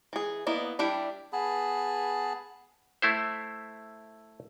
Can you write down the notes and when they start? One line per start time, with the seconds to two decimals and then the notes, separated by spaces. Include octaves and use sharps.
0.13 E3 G#4
0.47 A#3 B3 E4 D5 D#5
0.79 G3 D4 E4 G4
1.33 B3 G#4 A5 B5
3.02 A3 E4 C5